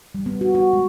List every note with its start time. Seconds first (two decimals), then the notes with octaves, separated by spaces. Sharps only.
0.15 G3
0.26 B3
0.41 F#4
0.55 F#4
0.73 G#3